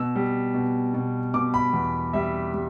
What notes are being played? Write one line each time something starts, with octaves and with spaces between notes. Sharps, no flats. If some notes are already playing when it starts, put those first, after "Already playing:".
Already playing: B2 E6
G3
B2
B2
B2 D6
B5
E2
G3 E5
G3